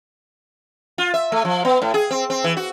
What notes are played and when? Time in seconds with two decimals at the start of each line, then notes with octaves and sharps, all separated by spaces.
0.98 F4
1.14 E5
1.32 A3
1.45 F3
1.65 B3
1.82 A2
1.94 G#4
2.11 C4
2.30 C4
2.44 E3
2.57 F#4